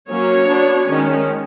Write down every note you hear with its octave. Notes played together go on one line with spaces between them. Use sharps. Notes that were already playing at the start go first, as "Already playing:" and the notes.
F#3 A#3 C#4 C#5
F#3 B3 D4
D#3 G#3 C#4